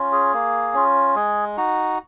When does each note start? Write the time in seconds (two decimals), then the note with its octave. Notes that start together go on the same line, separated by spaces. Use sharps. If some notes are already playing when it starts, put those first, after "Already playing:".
Already playing: C#4 F4
0.12 G#4
0.33 A#3
0.74 C#4 F4
1.15 G#3 G#4
1.57 D#4 F#4